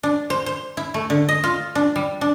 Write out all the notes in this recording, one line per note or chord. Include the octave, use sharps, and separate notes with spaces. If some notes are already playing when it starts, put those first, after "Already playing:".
D4
C5
C5
E4
A3
D3
D#5
F4
D4
G3
D4